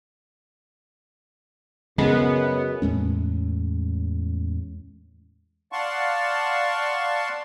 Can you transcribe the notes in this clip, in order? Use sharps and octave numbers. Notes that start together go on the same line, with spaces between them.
F#2 C#3 G#3 B3
E2 A2 G#3 C#4
D5 F5 F#5 A5 C6 C#6